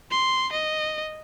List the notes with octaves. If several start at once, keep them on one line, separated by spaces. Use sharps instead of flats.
C6
D#5